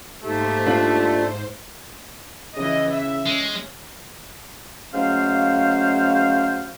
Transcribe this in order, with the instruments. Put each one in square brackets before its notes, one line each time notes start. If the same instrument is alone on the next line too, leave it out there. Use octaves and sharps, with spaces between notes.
[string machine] G#2 C5 [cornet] A3 [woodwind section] A#3 D#4 G4
[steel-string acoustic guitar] D4 F4
[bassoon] C#3 [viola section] E3 D#5
[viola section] E5
[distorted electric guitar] G#3 [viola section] C#4
[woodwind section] F#3 G#3 A3 C#4 C5 F5